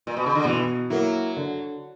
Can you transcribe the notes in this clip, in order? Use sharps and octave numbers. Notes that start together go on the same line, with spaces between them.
A#2
B2
C#3
D3
B2 E3
F#3 A#3 E4
D3